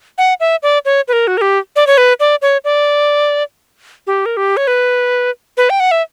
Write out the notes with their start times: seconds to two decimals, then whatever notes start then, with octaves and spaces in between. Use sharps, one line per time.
0.18 F#5
0.40 E5
0.63 D5
0.85 C#5
1.08 B4
1.13 A#4
1.27 F#4
1.37 A#4
1.41 G4
1.76 D5
1.87 C#5
1.98 B4
2.20 D5
2.42 C#5
2.64 D5
4.07 G4
4.26 A#4
4.37 G4
4.57 C#5
4.67 B4
5.57 B4
5.70 G5
5.80 F#5
5.91 E5